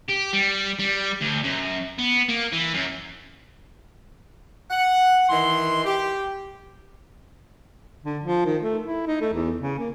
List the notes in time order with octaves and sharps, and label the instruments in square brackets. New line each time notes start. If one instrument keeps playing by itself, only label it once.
[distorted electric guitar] G4
G3
G3
D2
F#2
B3
A#3
E3
F#2
[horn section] F#5
D#3 E3 C6
G4
[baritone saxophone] D3
F3
D#3
A3
E4
D#4
A3
E2
C#3
A#3